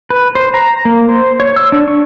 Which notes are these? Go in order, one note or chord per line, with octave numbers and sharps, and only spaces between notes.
B4
C5
A#5
A#3
C5
C#5
E6
D4
C#6